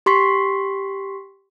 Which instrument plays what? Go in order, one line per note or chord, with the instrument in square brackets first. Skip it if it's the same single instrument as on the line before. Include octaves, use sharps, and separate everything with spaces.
[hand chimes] G4 C6 C#6 B6 C7